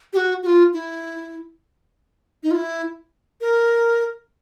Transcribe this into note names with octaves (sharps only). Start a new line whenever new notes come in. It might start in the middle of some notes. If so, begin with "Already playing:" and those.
G4
F#4
F#4
F4
E4
D#4
F4
E4
A#4